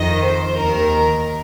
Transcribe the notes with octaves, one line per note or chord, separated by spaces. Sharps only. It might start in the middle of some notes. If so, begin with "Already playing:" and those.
Already playing: F2 D#3 D#5
C5
D#2 D#3 A#4